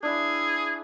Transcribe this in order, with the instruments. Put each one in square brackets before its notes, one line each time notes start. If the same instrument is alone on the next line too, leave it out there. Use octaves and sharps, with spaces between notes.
[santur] D4 E4 [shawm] G#4